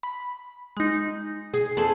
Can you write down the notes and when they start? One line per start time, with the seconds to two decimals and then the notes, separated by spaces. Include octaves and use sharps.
0.03 B5
0.77 G#3 D#4
1.54 G#4
1.77 F2 G#4 A4